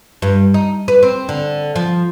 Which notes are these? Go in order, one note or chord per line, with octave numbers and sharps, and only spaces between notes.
G2
D#4
B4
C4
D3
F3